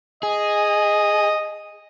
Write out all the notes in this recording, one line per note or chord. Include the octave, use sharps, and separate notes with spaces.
G#4 D#5